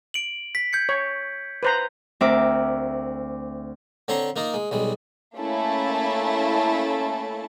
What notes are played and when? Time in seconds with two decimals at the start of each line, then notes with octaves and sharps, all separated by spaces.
0.14 D7 F#7
0.55 B6
0.73 G6 G#6 C#7
0.89 C#5
1.63 B4 C5 A#5
2.21 D2 C4 A#4 E5 D6
4.08 D3 C4 C#5 A#5 C6
4.36 A#3 D#4 F4 A#4
4.54 G#3
4.71 B1 G3 G#3
5.36 A3 A#3 C#4 E4 A5